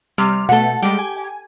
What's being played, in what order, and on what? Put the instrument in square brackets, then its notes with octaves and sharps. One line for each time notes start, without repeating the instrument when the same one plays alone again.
[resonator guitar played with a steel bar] C3 [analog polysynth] G3 F6
[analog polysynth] B2 A3 [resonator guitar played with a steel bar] A4 F#5
[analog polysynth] G3 G#3 [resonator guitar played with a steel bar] G4
[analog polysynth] G#5